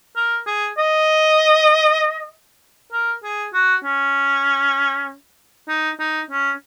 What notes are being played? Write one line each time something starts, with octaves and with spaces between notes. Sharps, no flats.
A#4
G#4
D#5
A#4
G#4
F#4
C#4
D#4
D#4
C#4